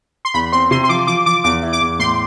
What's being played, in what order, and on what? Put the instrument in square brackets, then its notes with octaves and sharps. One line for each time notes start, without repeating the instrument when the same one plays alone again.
[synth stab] C6
[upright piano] E2 [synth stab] B5
[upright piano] C4 [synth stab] C6
[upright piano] C3 [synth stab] C6
[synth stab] C6
[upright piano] F3 [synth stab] D6
[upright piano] F3 [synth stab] D6
[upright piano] F3 [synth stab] D6
[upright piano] E2 [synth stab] D6
[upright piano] E4
[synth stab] D6
[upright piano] E2
[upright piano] A2 [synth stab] C6